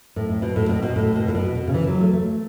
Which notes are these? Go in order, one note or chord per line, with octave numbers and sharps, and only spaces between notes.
A2
A2
B2
A2
B2
B2
A2
B2
A2
B2
B2
C#3
E3
F#3
A3
A3